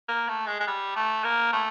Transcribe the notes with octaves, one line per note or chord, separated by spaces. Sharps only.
A#3
A3
G#3
G#3
G3
A3
A#3
A3